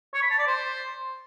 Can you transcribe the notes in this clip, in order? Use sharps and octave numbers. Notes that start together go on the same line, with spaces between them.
C#5
B5
A5
D5
C5